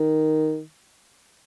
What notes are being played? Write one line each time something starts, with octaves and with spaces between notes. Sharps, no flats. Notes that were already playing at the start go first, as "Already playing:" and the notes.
Already playing: D#3